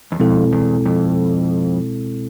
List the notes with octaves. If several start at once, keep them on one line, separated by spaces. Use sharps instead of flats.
E2
F2 B2 G#3 C4 E4 A4
E2
F2